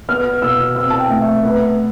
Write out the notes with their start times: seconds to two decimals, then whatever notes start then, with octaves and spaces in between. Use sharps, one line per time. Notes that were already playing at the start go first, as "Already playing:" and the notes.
0.09 B3 F6
0.42 B2 E6
0.76 C4 E6
0.90 A5
0.99 G5
1.10 A3
1.21 E5
1.43 B3 B4